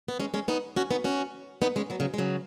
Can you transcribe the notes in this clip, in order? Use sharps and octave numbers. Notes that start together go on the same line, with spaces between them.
B3
G#3 C#4
G#3 C#4
B3 D#4
C#4 F#4
B3 D#4
C#4 F#4
B3 D#4
G#3 C#4
F#3 B3
C#3 F#3
G#3
C#3 F#3